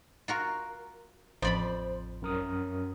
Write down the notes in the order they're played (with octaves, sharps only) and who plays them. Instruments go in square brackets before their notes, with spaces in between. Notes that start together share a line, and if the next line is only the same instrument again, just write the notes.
[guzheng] F4 F#4 A#4
[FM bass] A1 [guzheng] F2 D5 B5 [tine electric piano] C5
[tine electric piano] F#2 A#4 D#6